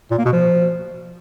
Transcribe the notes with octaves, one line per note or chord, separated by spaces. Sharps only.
A#2
A#3
B2
F3